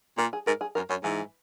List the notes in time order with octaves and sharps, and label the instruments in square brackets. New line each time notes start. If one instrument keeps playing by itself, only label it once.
[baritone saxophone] A#2 [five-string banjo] A#4
[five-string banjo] G#4
[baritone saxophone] G#2 [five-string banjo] A#4
[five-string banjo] G#4
[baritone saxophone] F#2 [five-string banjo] A#4
[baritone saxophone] F#2 [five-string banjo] C#4
[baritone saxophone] G#2 [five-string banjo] E3